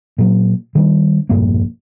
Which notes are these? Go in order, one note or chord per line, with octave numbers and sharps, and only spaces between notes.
A#2 F#3
D#3 G3 D4
E1 A#1 G2 A#3